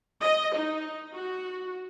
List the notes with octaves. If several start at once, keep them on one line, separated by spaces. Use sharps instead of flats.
D#5
D#4
F#4